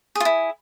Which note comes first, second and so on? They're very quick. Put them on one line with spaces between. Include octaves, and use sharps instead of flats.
G#4 F4 E4